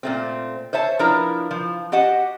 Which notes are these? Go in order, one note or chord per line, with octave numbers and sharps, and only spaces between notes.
A#2 A3 C4
C5 C#5 E5 A5
F3 D4 E4 A#4 B4 A#5
F3
F#4 G4 D#5 F#5 A5